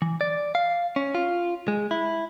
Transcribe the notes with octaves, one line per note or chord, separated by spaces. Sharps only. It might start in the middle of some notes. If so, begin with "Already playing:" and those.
E3
D5
F5
C#4
F4
G#3
E4